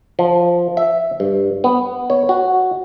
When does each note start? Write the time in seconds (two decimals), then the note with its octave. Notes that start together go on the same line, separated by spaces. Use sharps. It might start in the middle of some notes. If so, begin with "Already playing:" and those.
0.19 F3
0.77 E5
1.20 G2
1.64 B3
2.10 C#5
2.29 F#4